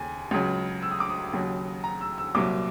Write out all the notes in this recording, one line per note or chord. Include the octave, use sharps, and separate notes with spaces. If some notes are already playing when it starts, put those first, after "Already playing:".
Already playing: D#2 C#3 G#5
C#2 C#3 F#3
E6
D#6
D6
D#6
D#2 C#3 F#3
A#5
E6
E6
C2 A#2 F#3 D6